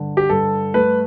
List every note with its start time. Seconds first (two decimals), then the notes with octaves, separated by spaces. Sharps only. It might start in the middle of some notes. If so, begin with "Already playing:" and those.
Already playing: G2 D3
0.17 G4
0.30 G2 A4
0.74 A3 B4